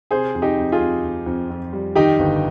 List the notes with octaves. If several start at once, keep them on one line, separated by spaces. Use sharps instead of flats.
C3 G#4 C5
F2
D#4 G4
F2
F4 G#4
F2
F2
F2
F2
G3
D#3 D#4 G4
G1